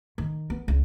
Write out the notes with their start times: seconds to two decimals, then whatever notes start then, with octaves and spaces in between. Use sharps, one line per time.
0.18 D#3
0.50 B3
0.68 C#2